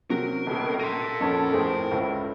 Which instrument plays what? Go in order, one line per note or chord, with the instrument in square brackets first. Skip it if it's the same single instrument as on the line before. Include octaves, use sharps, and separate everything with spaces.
[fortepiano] C3 F#3 [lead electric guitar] A#4
[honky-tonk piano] G1 C#2 B2 [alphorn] A4
[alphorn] A4 [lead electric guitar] A#4 C6 [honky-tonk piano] D#7
[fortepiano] F2 C#4 [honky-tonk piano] F#5 A5 B5
[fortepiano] F2 A2 G#4 [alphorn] C4
[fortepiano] C#2 [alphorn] A2